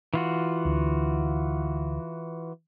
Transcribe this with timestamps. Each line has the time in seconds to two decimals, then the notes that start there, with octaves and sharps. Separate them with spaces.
0.14 E3 F4 F#4
0.65 D2